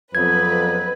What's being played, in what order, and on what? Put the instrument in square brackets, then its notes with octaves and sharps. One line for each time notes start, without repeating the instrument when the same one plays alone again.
[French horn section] F2 [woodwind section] C#3 F#3 B3 [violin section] B4 [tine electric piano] G#6